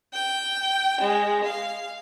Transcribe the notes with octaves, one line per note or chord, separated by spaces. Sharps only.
G5
G#3
F5